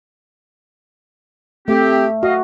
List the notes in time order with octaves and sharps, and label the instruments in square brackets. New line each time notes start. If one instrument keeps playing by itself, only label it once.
[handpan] A3 [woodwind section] C4 G4
[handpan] F#4 [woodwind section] D#5 F5